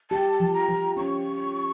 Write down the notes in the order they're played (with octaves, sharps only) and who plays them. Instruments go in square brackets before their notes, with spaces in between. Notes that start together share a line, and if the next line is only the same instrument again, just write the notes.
[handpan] G4 [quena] A5
[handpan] F3
[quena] A#5
[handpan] F3
[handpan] C#4 [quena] C#6